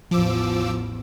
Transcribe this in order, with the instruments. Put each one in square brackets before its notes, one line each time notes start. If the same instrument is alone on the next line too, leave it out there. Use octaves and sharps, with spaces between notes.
[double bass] A1 E2 [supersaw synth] F3 D6 E6